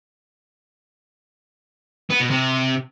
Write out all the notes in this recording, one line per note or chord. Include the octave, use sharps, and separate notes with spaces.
B3
B2
C3